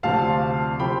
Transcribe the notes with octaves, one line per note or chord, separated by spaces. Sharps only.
D2 C3 F3 C4 F5 A5
C3 F3 C4 G5 B5